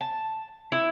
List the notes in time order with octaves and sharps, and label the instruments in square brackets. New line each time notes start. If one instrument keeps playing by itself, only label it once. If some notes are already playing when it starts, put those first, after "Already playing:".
[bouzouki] A5
E4